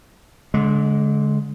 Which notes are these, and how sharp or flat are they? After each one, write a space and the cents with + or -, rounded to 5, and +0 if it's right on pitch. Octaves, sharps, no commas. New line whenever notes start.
D3 -30 G#3 +15